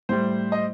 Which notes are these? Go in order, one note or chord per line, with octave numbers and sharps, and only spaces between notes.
A2 G3 C5
D#5